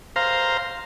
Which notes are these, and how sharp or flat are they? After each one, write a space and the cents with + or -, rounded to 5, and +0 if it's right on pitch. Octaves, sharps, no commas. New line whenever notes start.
C5 +0 F5 +0 A#5 +0